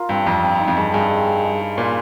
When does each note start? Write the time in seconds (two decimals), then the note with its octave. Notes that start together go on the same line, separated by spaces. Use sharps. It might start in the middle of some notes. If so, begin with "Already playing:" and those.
Already playing: F4 A#4
0.09 G2 C4
0.26 F2 A#4
0.43 C4
0.60 D#4
0.68 F2
0.77 G2 G#3
0.94 G2 G#4
1.10 G#3
1.28 C#4
1.44 G#3
1.61 G#4
1.78 A#2 C5